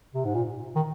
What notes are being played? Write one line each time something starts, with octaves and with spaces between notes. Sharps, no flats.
C3
G#2
A#2
D#3